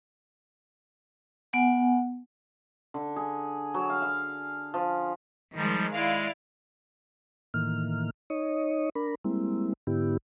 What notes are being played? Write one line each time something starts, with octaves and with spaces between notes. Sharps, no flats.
B3 F#5 G#5
D3
G#4
F#3
F5
F5
F3
D#3 F3 G3 G#3
G#3 E4 D5 F5
A2 D#3 E3 A#3 F6
D#4 C#5 D#5
D4 A#4 B5
G3 G#3 A#3 C4 E4
G#2 D3 B3 E4 G4